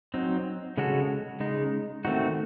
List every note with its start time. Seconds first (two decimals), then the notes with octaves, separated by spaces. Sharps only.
0.14 F#3 C4 D#4
0.77 C#3 G#3 C#4 F#4 A4
1.40 C#3 G#3 D#4
2.05 D#3 A3 C4 D#4 F#4